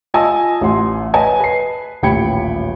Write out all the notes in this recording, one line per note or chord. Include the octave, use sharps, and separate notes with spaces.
F4 D#5 G#5 A5 D#6 E6
A1 F#5 C6
B4 C#5 D#5 G#5 A5
B4 C7
D#1 A1 G5 B5 G#6 C#7